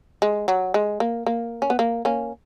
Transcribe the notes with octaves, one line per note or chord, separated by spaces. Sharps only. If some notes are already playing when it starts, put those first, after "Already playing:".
G#3
F#3
G#3
A#3
A#3
C#4
B3
A#3
A#3 C#4